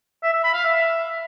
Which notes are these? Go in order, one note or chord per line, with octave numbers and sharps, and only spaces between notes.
E5
E5
B5
F5
E5